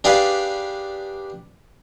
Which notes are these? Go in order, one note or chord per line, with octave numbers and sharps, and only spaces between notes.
D4 G4 G#4 B4 D5 F5